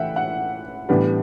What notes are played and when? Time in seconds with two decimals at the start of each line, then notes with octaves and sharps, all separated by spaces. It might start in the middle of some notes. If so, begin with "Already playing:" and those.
Already playing: E3 A3 E5 F#5 G5
0.16 F#5
0.89 A2 E3 G3 B3 D4